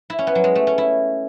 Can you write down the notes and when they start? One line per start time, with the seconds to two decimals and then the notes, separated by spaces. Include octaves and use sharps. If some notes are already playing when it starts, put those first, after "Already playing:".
0.10 E4
0.19 C#4
0.27 B3
0.35 F#3
0.44 G#3
0.55 A3
0.67 C#4
0.78 E4